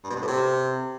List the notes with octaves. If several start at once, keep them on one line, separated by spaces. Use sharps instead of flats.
G2
B2
G2
A2
C3